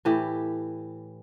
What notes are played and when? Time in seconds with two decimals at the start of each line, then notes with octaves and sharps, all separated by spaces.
0.05 A2 E3 G4